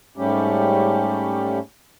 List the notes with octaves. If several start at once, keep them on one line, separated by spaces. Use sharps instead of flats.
G#2 G3 A3 C#4 G4